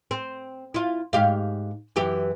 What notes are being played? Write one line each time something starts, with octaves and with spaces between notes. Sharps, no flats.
C4
E4 F4
G#2 G4 F5
F#2 E3 G4